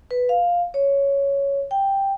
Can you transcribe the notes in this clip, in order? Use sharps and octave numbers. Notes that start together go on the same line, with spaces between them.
B4
F5
C#5
G5